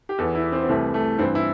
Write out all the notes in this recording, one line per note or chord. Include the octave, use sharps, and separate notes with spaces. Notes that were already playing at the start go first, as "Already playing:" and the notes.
G4
E2 E3 A4
E4
C4
C4
C2 C3 E3 A3
A3
G2 E3 C4
E4